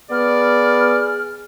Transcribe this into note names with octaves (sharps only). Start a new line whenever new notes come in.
B3 G#4 D5 F6